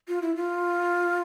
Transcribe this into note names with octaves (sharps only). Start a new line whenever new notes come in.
F4
E4
F4